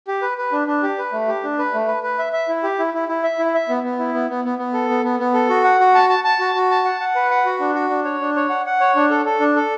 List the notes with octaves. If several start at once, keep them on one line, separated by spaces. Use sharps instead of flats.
G4
B4
B4
D4
D4
G4
B4
A3
G4
D4
B4
A3
B4
B4
E5
E5
E4
G4
E4
E4
E4
E5
E4
E5
B3
B3
E4
B3
B3
B3
B3
A4
B3
B3
B3
A4
F#4
F#5
F#4
A5
A5
A5
F#4
F#4
A5
F#5
F#5
B4
F#5
F#4
D4
F#4
D4
C#5
D4
C#5
F#5
F#5
C#5
D4
A4
A4
D4
A4